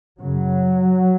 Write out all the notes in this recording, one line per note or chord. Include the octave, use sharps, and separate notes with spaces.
F#2 C#3 F#3